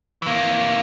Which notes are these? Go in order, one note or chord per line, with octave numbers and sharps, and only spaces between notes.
E3 A#3